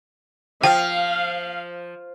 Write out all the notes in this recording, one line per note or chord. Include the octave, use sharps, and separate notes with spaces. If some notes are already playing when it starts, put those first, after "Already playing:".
F3 F5 G5